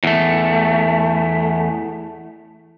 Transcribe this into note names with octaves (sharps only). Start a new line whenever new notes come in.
E2 A3